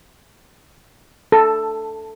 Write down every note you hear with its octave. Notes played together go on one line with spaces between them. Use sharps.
A4